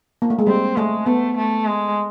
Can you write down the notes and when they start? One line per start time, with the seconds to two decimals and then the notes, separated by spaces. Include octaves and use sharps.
0.22 A#3
0.30 A3
0.39 G#3
0.47 G3 C4
0.77 G#3 A3
1.06 A3 B3
1.37 A3
1.66 G#3